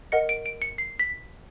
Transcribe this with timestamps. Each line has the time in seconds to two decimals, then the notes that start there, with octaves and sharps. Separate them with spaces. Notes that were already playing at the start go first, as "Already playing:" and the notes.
0.12 A#4 D#5 F#5 C#7
0.29 D7
0.46 D7
0.62 C#7
0.78 C7
0.99 B6